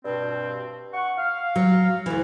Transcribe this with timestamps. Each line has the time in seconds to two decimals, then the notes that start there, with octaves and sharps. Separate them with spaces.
0.05 G2 B2 C4
0.94 F#5 C#6
1.18 F5
1.56 F#3
2.06 D2 E3